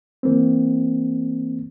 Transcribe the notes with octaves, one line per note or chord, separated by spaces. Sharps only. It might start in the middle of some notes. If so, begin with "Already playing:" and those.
E3 A#3 C4